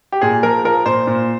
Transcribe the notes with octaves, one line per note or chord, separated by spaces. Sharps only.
G4
A#2 G#4
F3 A#4
F3 A#4
A#2 C5
A#2